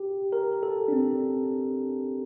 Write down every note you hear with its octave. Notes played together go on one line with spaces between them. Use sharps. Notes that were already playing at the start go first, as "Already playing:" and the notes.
Already playing: G4
A#4
A4
D4
C4